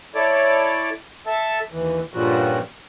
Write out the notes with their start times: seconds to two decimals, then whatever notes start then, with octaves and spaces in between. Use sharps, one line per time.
0.15 E4 A4 C#5 D5
1.26 A4 E5 A5
1.72 D#2 E3
2.14 G2 A#2 C#3 F3 G3 F#4